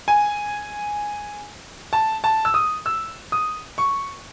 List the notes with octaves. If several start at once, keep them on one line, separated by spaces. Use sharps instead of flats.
G#5
A5
A5
E6
D#6
E6
D#6
C#6